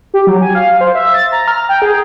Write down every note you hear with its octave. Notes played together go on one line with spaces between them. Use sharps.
G4
F#3
G#5
F5
C5
E5
A6
A#5
F6
G5
G#4